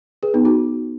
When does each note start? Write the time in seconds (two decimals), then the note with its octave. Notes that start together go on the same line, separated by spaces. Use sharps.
0.23 G#4 B4
0.34 B3 D#4
0.45 D#4 F#4